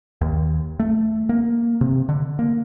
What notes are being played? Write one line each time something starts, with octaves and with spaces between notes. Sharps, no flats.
D#2
A3
A#3
C3
D3
A#3